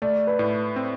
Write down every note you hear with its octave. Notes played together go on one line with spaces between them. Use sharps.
A3 D5
B4
A2
C4